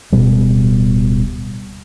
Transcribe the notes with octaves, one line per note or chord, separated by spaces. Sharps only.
D1 B2 G3